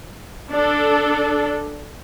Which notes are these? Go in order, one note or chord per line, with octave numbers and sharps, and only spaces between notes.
D4 A4